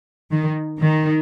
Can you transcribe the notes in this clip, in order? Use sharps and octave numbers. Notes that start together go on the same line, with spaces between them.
D#3
D#3